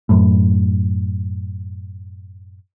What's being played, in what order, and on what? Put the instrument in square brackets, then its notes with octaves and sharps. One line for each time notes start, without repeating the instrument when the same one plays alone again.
[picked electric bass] F#2 A2